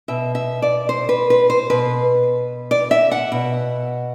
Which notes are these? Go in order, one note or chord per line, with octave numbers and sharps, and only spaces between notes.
B2 E5
E5
D5
C5
B4
B4
C5
B2 B4
D5
E5
F#5
B2